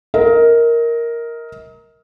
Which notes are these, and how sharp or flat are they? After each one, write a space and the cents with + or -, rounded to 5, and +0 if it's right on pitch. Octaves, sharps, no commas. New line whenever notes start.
A#4 +0 D#5 +35